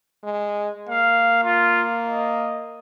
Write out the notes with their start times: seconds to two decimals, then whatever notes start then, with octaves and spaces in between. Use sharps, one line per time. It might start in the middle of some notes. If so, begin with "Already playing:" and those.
0.24 G#3
0.89 A#3 F5
1.44 F4
2.07 D#5